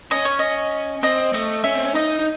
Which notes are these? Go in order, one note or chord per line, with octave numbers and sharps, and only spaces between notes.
C#4 D#5
C#5
D#5
C4 D#5
A3 D#5
C#4 E5
C4
C#4
D#4 D#5
D#4